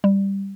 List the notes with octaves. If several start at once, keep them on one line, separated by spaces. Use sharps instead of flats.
G3